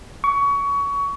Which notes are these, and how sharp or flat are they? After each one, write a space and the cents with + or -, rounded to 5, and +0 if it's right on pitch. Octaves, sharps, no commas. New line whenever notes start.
C#6 +25